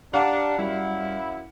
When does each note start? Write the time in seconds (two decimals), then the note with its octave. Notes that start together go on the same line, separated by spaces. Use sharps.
0.14 D4 G4 F5 F#5 A#5
0.59 F#2 G3 E4